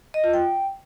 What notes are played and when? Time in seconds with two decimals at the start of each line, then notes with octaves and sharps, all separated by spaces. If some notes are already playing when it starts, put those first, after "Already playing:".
0.14 D#5
0.24 F4
0.33 G5